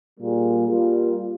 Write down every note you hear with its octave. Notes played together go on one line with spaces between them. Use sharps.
A#2 G3 A#3 F4 G#4
G3 A#3 F4